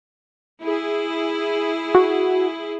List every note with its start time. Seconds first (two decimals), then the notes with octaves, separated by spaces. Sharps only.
0.61 E4 G#4
1.95 F#4